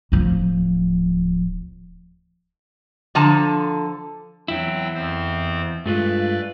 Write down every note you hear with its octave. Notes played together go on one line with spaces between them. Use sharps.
D1 F3
D3 F3 A5 A#5
E2 F#3 C4 E4 G5
F2 C4 C5
G2 G#3 A3 F4 B4 D5